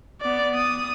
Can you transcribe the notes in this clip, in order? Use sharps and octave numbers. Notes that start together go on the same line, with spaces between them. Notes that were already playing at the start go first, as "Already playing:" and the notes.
B3 D5
D#6